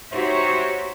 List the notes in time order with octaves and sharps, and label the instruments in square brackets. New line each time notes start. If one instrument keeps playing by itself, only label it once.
[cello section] D#4 F#4 G4 C5 C#5 E5